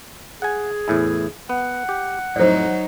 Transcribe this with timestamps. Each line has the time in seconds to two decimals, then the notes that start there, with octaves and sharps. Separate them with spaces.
0.42 G#4 F#5 G#5
0.88 E2 A2 E4 G#5
1.49 B3 F#5
1.89 G4
2.36 F2 A2 F#3 D#4 C5 D5